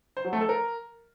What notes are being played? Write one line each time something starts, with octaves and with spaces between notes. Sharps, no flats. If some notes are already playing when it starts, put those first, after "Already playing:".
C5
F#3
A3
A4
A#4